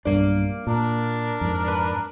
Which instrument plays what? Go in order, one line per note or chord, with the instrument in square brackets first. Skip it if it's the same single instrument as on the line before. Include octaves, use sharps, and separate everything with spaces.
[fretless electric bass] B1 G2 D4 [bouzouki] A#3 D5
[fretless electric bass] A#2 [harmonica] D4 A#4
[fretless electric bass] F2 G#2
[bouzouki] B4